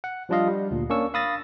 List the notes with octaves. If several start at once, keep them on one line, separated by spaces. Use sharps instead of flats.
F#5
F3 G3 D4 F4 D#5 F5
G3
D2 A#2
A#3 C#4 D4 C#6 E6
F5 B5 D#6 E6 A6 A#6